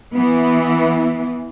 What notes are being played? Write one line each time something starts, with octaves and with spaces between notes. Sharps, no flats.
E3 B3